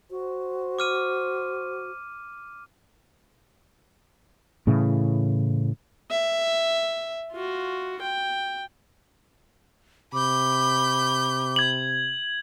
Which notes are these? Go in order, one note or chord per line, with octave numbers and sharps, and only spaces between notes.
F#4 C5
D6 F6 D#7
A2 C#3 E3
E5
F4 F#4
G5
C3 B5 D6 G6
G#6 F#7